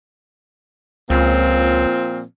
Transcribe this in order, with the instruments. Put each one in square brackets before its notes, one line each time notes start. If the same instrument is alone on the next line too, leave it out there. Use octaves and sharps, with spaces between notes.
[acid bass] C#2 [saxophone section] A#2 F3 C4